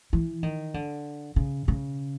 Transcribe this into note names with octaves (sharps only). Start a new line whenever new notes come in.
E3
D#3
D3
C#3
C#3